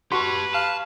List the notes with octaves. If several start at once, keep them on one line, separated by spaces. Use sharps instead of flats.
F#4 G4 B4 A5 C6 C#6
F5 A5